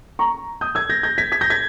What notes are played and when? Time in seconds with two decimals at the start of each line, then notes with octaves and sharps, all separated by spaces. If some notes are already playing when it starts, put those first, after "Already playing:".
0.19 A#5 C#6
0.61 D#6 G6
0.75 E6 G#6
0.90 G6 A#6
1.03 G6 A#6
1.18 G#6 B6
1.32 G#6 B6
1.41 G6 A#6
1.50 G#6 B6